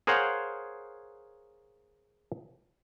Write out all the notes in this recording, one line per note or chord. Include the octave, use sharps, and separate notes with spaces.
G#4 A#4 C5 C#5 F5 F#5